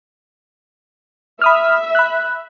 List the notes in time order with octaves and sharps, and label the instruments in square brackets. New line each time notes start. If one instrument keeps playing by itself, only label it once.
[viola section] E5 [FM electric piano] B5 D#6 F6
[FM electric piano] B5 F#6